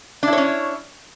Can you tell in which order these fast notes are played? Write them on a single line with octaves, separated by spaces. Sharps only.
D4 E4 C#5 C#4